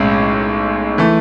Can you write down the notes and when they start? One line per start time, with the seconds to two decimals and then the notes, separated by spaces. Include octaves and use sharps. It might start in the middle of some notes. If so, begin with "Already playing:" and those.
Already playing: B1 A2 G#3 C#4
0.98 E3 A3